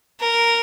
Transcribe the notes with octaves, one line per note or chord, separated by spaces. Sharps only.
A#4